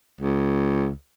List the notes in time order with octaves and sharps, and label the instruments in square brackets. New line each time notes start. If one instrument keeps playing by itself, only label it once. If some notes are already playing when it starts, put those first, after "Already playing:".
[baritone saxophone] C#2